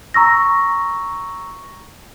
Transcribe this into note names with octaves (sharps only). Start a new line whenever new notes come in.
A#5 C#6 E6 A#6